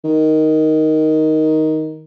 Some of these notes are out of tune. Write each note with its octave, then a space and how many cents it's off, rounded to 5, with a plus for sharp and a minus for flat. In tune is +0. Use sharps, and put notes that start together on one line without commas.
D#3 +5